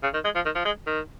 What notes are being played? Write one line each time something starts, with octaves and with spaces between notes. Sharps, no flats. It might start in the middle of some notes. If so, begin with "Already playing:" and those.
C#3
D#3
G#3
F3
D#3
F3
G#3
D#3